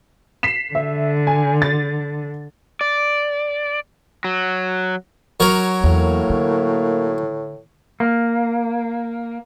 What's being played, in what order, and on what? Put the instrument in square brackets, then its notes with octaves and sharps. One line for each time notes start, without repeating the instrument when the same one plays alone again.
[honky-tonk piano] B6 C7 E7
[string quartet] D3 [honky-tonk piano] E5
[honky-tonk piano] G#5
A6
[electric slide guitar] D5
F#3
[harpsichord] F#3 A#4 C#5
[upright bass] E2 [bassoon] A2 [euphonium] A#3
[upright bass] D3
[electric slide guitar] A#3